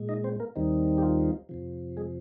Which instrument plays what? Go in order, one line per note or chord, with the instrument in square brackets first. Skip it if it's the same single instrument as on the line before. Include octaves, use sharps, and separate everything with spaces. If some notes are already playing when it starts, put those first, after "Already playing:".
Already playing: [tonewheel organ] A#2 G#3
D#4 D#5
C4 C5
A#3 A#4
D#2 D#3 G3 C4 D#4
G4
F4
F2 C3 F3
G#3 G#4